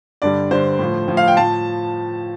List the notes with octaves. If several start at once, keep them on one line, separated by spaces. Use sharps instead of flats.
G2 D3 G3 D5
G2 D3 G3 C5
A2 F3
A2 F3
F5
G5
A2 F3 A5